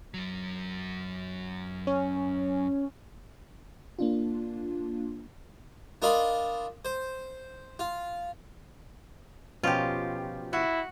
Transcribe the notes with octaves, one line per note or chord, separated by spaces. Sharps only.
F#2 F#3
C#4
A#3 D4 F4
D4 F4 A#4 D#5 B5
C5
F4
B2 F3 C#4 F4 G4
E4 F#4